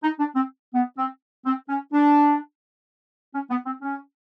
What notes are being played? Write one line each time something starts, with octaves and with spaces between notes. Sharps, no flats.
D#4
D4
C4
B3
C4
C4
C#4
D4
C#4
B3
C4
C#4